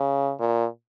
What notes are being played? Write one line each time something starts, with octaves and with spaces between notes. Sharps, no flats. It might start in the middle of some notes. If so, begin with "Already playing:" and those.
Already playing: C#3
A#2